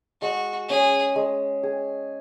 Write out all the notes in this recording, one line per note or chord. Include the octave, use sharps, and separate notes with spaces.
G#3 F#4
C#4 G#4
G#3
G#4